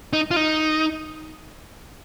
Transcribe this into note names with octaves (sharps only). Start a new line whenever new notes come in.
D#4
F4
D#4